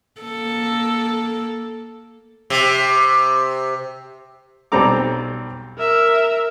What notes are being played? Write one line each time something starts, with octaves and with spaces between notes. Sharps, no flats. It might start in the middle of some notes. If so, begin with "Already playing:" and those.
A#3 A4
C3
B1 G3 C4 A4 A#5 D6
A#4 E5